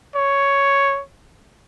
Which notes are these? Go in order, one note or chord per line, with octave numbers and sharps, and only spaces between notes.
C#5